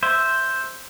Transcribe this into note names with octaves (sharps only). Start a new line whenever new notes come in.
C5 E5